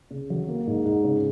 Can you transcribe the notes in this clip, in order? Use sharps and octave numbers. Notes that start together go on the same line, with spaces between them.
C#3
F#3
A#3
G#2
G#2
C#3